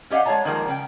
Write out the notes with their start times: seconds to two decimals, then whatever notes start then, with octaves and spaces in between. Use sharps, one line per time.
0.10 C#4 G4 D#5 F5 F#5
0.25 G#3 G#4 C#5 E5 A5 A#5
0.45 D#3 F3 G3 G#3 A#3 A#4
0.68 C#3 G5